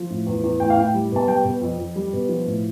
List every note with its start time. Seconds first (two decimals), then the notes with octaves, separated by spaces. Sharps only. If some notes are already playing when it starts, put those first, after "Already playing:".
Already playing: F3
0.10 A2
0.27 E2
0.44 E2
0.60 A2 G5
0.70 F5
0.77 A2 G5
0.94 G3
1.12 B2 A5
1.28 G3 G5
1.45 B2
1.61 F2
1.78 F2
1.96 G3
2.13 B2
2.29 F3
2.46 A2